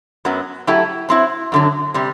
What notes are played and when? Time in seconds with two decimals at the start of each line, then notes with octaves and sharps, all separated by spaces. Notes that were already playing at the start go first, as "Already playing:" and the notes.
0.25 F#2 F#3 B3
0.67 F#3 A3 E4 G4
1.09 F#3 C4 E4
1.52 F#2 D3 F#3
1.94 C3 G3